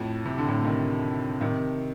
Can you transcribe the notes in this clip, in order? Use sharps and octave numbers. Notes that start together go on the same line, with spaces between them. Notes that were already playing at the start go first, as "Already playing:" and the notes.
Already playing: F2 A2
C3
D3
A2 C3
C3 D#3
C3 D#3